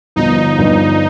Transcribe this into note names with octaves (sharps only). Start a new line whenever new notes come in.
G1 G2 F3 D#4
G1 G2 F3